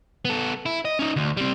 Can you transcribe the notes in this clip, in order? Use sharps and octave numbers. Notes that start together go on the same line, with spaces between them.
B3 A4
E4
D#5
C#4 D#4
D2
G3 C4